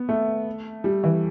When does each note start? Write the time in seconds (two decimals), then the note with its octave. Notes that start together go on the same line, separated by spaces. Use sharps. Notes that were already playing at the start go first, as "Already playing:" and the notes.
Already playing: B3
0.09 A3
0.84 G3
1.04 E3